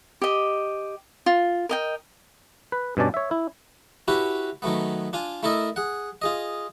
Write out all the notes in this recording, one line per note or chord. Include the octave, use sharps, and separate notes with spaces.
G4 D#5
F4
A#4 D#5 G5
B4
G2 B2 C#4 D5 A5
C#5 E5
E4
C#4 E4 F#4 G4 B4
D#3 F#3 A3 B3
D4 F4 G#5
A3 E4 A4 A#4 D#5
G#4 F#5
F4 G#4 D#5